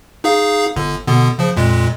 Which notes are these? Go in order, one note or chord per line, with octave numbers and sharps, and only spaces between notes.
D#4 G#4 F5
G1 D3
B2 D3 B3
C#3 F3
F2 A#2 G#3